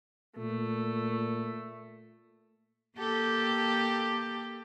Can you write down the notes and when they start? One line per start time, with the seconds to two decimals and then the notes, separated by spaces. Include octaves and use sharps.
0.37 A#2 A3
2.97 A#3 G4 A4